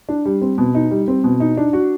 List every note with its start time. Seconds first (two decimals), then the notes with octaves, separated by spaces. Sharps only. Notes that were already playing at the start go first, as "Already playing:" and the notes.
0.09 D4
0.25 G3
0.42 C4
0.58 B2
0.75 D#4
0.91 G3
1.08 C4
1.24 B2
1.40 D#4
1.57 D4
1.73 F#4